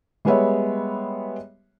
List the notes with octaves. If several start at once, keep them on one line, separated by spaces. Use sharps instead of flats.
G3 G#3 B3 C#5 E5